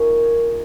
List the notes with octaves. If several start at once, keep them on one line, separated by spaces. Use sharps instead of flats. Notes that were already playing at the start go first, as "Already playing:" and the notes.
Already playing: A#3 C#4 D#4 F4 G#4 A#4 C#5